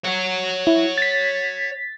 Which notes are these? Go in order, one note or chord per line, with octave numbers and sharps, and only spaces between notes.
C#5 F#5
E4
A6 B6